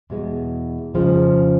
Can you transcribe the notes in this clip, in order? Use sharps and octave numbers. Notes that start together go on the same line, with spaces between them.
E2 B2 G#3
F2 C#3 F3 G#3